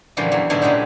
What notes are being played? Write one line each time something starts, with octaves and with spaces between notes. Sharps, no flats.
F#2 A#2 D3 E3 F3 G3
E2 E3 F#3
G#2 B2 D3 F#3 D4 E4
A#2 C#3 F#3 G#3 G4